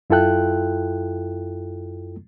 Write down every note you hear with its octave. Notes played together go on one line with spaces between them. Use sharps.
F#2 E4 F4 A4 G5 F#6